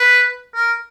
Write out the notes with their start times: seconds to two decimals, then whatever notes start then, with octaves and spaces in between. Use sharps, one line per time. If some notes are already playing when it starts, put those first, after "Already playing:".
Already playing: B4
0.54 A#4